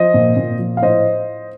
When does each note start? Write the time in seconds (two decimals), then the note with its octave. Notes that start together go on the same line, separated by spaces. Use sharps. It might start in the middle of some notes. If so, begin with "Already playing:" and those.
Already playing: F3 C5 D#5
0.14 A#2
0.37 A#2
0.59 F3
0.77 F5
0.82 A2 C5 D#5